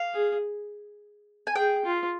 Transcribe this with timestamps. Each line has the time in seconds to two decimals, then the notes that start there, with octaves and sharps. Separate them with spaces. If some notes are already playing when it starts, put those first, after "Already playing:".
Already playing: F5
0.14 G#4
1.47 G#5
1.56 G#4 G5
1.85 F4